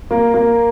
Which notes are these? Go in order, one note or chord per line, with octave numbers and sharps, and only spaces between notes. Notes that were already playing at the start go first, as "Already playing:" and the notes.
A#3
A#3